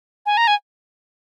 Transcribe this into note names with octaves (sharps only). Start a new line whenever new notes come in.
G#5
A#5
G#5